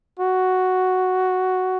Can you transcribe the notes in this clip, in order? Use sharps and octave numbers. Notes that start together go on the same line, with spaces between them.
F#4